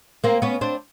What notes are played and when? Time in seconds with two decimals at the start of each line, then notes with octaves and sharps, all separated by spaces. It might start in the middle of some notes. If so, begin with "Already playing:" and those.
0.24 A#3 C4
0.42 B3 C#4
0.61 C4 D4